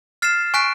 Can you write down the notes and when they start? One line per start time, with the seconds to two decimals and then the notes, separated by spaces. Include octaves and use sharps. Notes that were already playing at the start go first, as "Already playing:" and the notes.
0.22 F6 A6 C7 E7
0.54 G#5 C#6 F#6 B6 D7